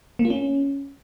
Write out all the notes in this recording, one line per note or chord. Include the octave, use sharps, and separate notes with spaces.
A#3
F4
C#4